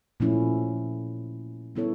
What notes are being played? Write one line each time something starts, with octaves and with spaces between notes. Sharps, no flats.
A#2 F3 A3 C#4 E4
G3 B3 E4 A4 C#5